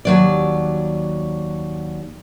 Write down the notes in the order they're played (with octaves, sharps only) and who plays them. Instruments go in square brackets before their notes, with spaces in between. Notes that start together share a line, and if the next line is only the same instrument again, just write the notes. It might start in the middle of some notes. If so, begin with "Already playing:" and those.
[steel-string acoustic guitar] D#2 F#3 D5